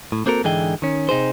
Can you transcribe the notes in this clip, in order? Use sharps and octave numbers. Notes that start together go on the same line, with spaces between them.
A2
A#3 C4 F#4 A4 A#4
G#2 D3 E3 G#4 D#5 G5
D#3 C#4
C3 D#4 G#4 C5